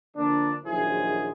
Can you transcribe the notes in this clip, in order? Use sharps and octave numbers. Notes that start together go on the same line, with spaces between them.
D3 F3 A#3 D4
A#1 D#2 F#3 E4 G#4 C5